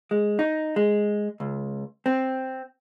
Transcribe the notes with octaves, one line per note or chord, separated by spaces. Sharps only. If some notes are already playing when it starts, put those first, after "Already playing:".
G#3
D#4
G#3
C#2
C4